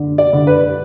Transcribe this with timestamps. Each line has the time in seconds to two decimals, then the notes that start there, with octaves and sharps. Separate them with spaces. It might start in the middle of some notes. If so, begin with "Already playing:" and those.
Already playing: D3
0.18 D5
0.33 D3
0.47 B4